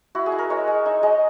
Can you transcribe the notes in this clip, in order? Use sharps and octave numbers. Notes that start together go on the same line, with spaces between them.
E4 F#4
G#4
E4
A#4
G#3 C#5
G#3
D#4 E5
G#3 D#5